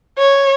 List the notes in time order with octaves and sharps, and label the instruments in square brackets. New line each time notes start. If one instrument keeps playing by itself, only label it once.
[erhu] C#5